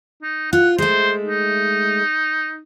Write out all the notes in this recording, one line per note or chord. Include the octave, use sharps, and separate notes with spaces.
D#4
F4 F#5
G#3 A3 C5
D#4